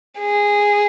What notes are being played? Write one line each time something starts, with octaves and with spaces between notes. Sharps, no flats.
G#4